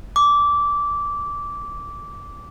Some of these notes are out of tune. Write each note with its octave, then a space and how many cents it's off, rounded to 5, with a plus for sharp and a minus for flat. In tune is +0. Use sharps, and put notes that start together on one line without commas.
D6 -15